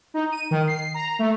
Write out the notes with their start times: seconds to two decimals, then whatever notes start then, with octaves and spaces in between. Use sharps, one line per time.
0.14 D#4
0.32 D#7
0.51 D#3
0.68 C7
0.94 A#5
1.19 A3